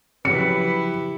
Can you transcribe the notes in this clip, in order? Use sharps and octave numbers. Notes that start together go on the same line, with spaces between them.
C#3 F3 F#3 E4 G4 B4 C#7